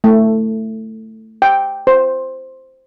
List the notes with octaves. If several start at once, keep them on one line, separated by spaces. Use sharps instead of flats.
A3
G5
C5